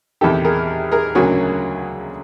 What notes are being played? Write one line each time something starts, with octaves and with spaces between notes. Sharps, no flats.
E2 C3 D#3 G4 A4
G#4 A#4
G#4 A#4
D2 C#3 F#3 A#3 F#4 G#4